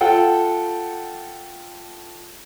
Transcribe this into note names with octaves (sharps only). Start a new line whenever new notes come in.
F4 A4 F#5 G5